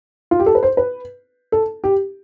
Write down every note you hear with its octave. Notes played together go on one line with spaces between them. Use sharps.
F4
G4
A4
B4
C5
B4
A4
G4